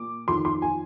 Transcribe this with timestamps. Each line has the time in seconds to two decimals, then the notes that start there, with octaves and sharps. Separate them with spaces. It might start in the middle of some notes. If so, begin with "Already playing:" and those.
Already playing: A#2 D6
0.28 F2 D#3 C6
0.45 C6
0.62 G#5